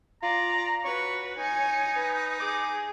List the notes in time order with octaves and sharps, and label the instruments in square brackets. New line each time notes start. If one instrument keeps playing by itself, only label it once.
[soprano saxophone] F4 [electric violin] D5 [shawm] A#5
[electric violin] F#4 B4 [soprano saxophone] C#5 [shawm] C#6
[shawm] D#4 [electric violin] G#5 C#7
[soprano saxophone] B4
[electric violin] G#4 [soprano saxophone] D6